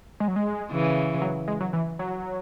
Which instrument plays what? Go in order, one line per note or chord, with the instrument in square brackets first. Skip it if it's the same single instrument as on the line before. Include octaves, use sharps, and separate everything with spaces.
[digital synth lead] G#3
F#3
G#3
[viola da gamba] C#3 E3
[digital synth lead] F#3
G#3
F#3
E3
F#3